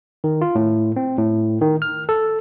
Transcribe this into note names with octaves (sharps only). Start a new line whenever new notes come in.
D#3
F4
A2
C4
A2
D#3
F6
A4